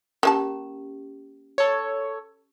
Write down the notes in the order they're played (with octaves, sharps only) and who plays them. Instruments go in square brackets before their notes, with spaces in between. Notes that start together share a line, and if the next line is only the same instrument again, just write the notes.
[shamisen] A#3 E5 A5 [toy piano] C#4 G4
[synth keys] A4 C#5